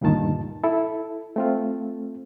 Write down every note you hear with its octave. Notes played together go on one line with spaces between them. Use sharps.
D2 G2 A#2 D#3 A5
E4 A4
A3 C4 F4